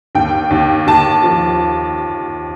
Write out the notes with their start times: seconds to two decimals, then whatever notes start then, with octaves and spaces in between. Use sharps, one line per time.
0.15 D#2 G5
0.51 D#2
0.87 D#2 A5
1.24 F3